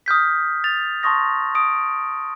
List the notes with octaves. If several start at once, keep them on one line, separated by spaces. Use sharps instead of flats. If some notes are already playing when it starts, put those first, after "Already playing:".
D#6 F6 G6 B6
A6 F7
A5 C6 C#6 D#6 A#6
D#6 D7